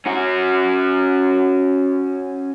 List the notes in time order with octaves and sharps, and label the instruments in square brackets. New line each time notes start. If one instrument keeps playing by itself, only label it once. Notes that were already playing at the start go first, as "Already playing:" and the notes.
[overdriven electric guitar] C#4 F#4